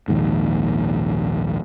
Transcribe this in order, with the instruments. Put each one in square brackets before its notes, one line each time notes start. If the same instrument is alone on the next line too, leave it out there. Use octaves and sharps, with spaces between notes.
[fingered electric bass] A#1 D#2 G#2